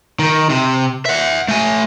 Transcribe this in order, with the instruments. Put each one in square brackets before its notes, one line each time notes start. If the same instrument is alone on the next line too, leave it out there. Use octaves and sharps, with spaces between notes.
[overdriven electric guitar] D#3
C3
E5 F#5
A3 G#5